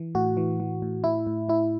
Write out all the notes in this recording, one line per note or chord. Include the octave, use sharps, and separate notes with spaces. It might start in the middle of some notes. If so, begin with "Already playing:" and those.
Already playing: E3
A2 F#4
E3
E3
A2
A2 E4
A2
A2 E4